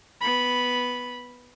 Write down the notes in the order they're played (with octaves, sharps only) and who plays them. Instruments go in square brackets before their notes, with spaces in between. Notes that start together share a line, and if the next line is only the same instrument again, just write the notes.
[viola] B3 B5